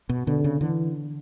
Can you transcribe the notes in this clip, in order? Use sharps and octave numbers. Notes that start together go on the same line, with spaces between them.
B2
B2 D3
C#3
D3 E3